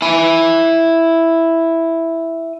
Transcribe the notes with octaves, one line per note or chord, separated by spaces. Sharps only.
E4 G#5